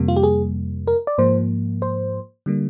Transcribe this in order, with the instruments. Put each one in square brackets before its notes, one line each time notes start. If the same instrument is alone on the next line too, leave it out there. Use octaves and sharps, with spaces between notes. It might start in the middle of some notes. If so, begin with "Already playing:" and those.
Already playing: [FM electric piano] F2 C3 G3 A#3
F4
G4
G#4
A#4
D5
G#2 F3 A#3 C5
C5
D3 G3 A#3